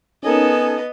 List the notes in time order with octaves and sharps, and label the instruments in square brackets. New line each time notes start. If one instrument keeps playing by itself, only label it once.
[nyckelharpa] B3 D#5 [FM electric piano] C#4 D#4 A#4 [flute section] A4 G#5